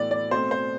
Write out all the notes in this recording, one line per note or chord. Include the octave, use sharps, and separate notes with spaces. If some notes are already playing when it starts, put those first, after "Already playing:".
Already playing: A2 E3 B3 D5
D5
B2 A3 C4 C5
C5